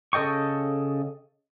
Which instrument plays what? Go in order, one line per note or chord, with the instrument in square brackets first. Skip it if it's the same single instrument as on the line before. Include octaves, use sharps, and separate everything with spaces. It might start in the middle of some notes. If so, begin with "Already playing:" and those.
[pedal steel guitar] C#3 A4 D#5 G5 C#6